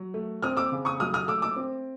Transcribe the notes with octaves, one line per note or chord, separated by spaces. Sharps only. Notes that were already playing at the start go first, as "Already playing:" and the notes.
Already playing: F#3
A3
C4 D#6 F6
D6 E6
C#3
C#6 D#6
F#3 D#6 F6
D#6 F6
A3 D6 E6
D6 E6
C4